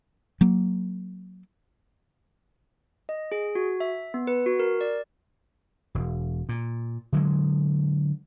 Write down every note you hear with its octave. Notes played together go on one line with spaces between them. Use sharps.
F#3 A#3
D#5
G#4
F#4
E5
B3
B4
F#4
A#4
D5
E1
A#2
D3 F#3 G#3